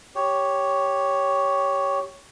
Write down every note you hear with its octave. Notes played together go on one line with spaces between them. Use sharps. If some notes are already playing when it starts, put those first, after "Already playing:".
G4 C#5